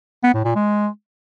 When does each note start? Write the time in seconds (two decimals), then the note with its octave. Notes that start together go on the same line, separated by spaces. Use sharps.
0.24 B3
0.34 A2
0.45 A#2
0.56 G#3